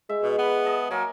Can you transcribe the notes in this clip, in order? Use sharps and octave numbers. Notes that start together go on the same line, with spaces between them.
G#3 E5
B2
B3 B4
D#5 A5
F#3 A#3 A#4 G#5